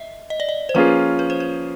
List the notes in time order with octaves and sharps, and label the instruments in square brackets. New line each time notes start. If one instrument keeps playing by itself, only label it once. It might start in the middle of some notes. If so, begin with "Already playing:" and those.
Already playing: [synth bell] D#5 E5
D#5
D5
D#5
C5
[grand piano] F3 A#3 C#4 F4 G#4 [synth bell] B4
[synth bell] B4
C5
B4